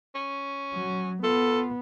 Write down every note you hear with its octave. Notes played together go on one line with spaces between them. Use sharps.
C#4
F#3
B3 F4 A4